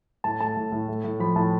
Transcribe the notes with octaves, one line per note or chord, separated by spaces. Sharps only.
A2 A5
A3 A5
A2
A2
A3
A2
F3 B5
A2 A5